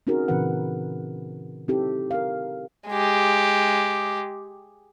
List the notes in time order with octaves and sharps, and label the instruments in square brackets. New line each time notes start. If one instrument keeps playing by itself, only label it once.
[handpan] C4 C#4 D#4 F#4 G#4 A#4
A#2 C#3 E3 C4 B4 F#5
C4 D#4 E4 G4 A4
A#4 F5
[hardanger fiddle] G#3 G4